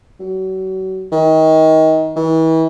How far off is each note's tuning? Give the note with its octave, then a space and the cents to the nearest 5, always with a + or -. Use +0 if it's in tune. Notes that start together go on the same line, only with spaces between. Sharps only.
F#3 +35
D#3 +30
E3 -35